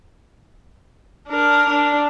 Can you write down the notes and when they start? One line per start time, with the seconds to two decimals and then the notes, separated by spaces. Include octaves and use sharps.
1.29 D4 A#4
1.69 D4